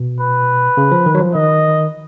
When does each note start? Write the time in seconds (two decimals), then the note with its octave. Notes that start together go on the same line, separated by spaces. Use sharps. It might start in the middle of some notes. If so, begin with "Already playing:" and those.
Already playing: B2
0.20 B4
0.77 C#3
0.91 F3
1.06 D#3
1.14 F#3
1.20 F3
1.34 D#3 D#5